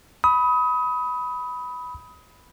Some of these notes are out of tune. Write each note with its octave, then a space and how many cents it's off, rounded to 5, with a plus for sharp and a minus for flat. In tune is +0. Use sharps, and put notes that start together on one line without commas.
B5 +0 D#6 +30